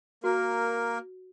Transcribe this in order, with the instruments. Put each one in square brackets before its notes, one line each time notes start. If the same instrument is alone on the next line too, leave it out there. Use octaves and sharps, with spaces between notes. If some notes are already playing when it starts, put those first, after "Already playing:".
[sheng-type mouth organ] A#3 A#4 [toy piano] F#4